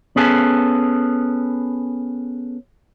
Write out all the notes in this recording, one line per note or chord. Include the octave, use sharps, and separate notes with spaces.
B3 C#4 G#4 A4